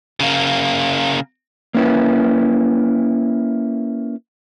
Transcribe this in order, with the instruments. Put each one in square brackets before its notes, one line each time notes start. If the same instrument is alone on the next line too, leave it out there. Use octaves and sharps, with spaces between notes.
[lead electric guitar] C#3 A#3
[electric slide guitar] A#3 C#4 E4 B4